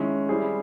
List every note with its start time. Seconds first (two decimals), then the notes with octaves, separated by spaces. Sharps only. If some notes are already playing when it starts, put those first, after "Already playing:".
Already playing: D#3 G#3 C#4 E4
0.29 G3 C4 E4 G#4